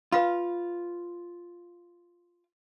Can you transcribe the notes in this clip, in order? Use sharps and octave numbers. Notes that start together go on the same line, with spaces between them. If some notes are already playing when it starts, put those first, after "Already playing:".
F4 B4 F5 B5